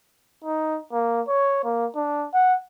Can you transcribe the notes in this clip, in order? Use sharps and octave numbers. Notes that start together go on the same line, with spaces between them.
D#4
A#3
C#5
A#3
D4
F#5